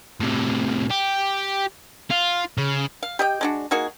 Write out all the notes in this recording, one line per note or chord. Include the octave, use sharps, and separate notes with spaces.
A2 C3
G4
F4
C#3
F5
G4 D#5 G5
G#3 D4 F#4
A#3 D#4 F#4 G#4